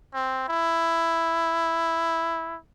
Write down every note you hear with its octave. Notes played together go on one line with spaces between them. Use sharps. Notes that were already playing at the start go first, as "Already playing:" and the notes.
C4
E4